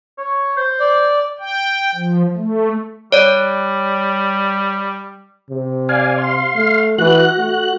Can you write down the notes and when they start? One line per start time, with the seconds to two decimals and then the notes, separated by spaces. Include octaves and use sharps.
0.18 C#5
0.57 C5
0.80 D5
1.39 G5
1.95 F3
2.37 A3
3.12 G3 C#5 D5
5.50 C3
5.89 D5 F5 G#5
6.18 F5 C6
6.56 A3
6.98 E3 F#4 F#6
7.37 A3